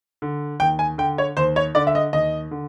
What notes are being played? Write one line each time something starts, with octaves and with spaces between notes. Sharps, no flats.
D3
D#2 G5
G#5
D3 G5
C#5
D#2 C5
C#5
D3 D5
E5
D#5
D#2 D#5
D3